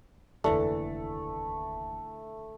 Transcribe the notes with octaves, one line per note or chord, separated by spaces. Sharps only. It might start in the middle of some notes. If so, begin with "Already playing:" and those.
F1 D#2 D3 E3 A3